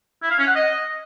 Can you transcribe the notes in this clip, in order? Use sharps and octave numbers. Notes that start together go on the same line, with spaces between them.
E4
F5
C#4
F#5
D#5